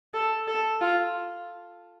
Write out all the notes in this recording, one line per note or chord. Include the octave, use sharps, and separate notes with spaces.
A4
A4
F4